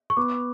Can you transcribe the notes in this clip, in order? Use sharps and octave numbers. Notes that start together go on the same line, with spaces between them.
C#6
B3 D6